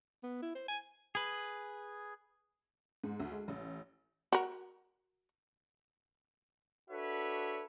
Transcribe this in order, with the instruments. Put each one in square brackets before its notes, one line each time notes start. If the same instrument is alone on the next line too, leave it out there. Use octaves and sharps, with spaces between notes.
[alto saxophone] B3
E4
C5
G#5
[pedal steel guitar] G#4 B4
[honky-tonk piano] G#2
D2
G#3
A1
[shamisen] F#4 A#4
[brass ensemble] D4 F#4 A4 B4 C#5 E5